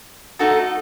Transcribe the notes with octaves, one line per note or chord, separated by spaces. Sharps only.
A3 D#4 F#4 A4